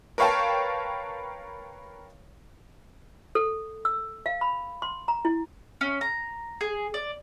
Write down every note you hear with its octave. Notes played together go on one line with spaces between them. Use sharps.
A#4 B4 C#5 F5 G5 A5
A4
E6
F5
B5
C6
A#5
E4
C#4
A#5
G#4
D5